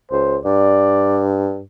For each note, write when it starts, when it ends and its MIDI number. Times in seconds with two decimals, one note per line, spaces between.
0.11 0.38 37
0.11 0.38 72
0.45 1.61 43
0.45 1.27 74